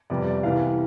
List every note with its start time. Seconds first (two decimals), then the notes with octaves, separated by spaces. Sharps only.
0.10 F2 C3 G3 B3 D5
0.27 D5
0.43 C2 C3 E3 B3 F5